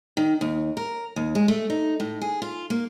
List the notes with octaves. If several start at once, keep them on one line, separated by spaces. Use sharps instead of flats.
D#3
D#2
A#4
D#2
G#3
A3
D#4
A2
G#4
F4
A#3